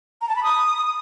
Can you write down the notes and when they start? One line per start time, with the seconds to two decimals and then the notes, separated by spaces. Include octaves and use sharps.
0.22 A#5
0.29 A5
0.36 B5
0.43 D#6